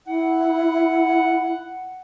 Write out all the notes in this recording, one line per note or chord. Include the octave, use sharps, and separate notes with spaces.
E4 F#5